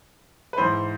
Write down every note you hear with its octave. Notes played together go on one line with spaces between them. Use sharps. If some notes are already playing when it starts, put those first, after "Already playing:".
B4
G#2 E3 C5